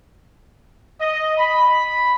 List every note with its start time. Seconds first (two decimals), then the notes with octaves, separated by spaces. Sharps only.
1.00 D#5
1.38 B5